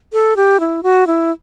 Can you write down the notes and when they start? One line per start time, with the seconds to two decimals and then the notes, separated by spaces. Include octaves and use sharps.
0.13 A4
0.36 G4
0.60 E4
0.83 F#4
1.07 E4